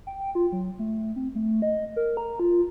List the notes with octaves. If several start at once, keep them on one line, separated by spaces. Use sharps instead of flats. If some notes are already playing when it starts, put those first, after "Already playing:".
G5
F4
F#3
A3
C4
A3
D#5
A#4
A#5
F4